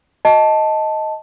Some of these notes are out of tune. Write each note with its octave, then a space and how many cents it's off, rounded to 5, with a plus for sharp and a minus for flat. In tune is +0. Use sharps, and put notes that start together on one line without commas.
D#5 +10 A5 +0